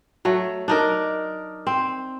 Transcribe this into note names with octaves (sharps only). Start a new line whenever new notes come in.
F#3 A3
D4 D#4 A#4
C4